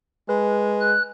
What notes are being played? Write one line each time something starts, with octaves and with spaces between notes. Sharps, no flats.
G#3 B4
F#6